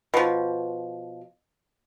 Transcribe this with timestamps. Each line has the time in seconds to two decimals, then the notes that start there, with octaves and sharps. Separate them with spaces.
0.14 B2 F3